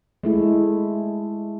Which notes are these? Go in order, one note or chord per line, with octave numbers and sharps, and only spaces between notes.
G#3 A3 E4